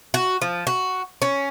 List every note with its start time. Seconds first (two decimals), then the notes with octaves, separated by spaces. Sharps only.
0.14 F#4
0.42 F3
0.67 F#4
1.22 C#4